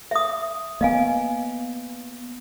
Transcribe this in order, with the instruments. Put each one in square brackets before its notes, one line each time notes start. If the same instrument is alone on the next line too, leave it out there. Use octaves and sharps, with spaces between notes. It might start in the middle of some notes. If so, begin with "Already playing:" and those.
[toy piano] E5 D#6
[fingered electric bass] A#3 B3 [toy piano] D#5 F5 G#5